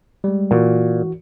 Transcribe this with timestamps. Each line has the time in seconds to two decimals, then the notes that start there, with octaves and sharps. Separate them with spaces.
0.24 G3 G#3
0.51 A#2 E3 F#4